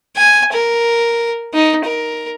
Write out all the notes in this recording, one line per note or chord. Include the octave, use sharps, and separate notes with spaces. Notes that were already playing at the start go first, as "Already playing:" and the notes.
G#5
A#4
D#4
A#4